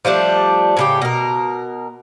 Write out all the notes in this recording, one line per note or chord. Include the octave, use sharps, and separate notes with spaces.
F3 G3 A3 D4
A2 C#3 G4
B2 A#4